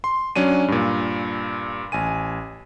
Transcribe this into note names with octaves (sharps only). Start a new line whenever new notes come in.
C6
F#3 C#4 D4 D#7
G2 A#2
A1 G#5 D#7